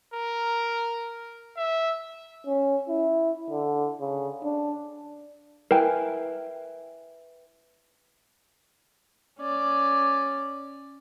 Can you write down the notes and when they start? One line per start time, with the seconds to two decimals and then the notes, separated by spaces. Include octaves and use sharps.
0.14 A#4
1.57 E5
2.47 C#4
2.89 E4
3.50 D3
4.00 C#3
4.44 D4
5.71 E4 A#4 B4 G5 G#5
9.40 C#4 D5